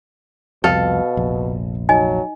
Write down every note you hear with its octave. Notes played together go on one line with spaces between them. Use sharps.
C2 F2 B2 A4 F5
F1 A#1
F#3 D#4 D#5 G#5